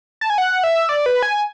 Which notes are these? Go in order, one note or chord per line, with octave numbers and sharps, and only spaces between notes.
A5
G#5
F#5
E5
D5
B4
G#5